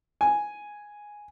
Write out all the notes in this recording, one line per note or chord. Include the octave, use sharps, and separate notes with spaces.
G#5